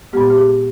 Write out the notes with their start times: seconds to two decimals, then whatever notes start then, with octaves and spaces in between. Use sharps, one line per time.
0.13 A#2 G#3 B3 G4
0.30 G4
0.38 G#4